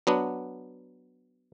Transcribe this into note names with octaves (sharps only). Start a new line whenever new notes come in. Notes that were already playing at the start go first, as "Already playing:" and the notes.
F#3 B3 D4